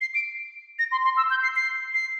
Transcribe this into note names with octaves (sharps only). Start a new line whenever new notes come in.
C7
D7
A#6
C6
C6
E6
G6
C7
C7
C7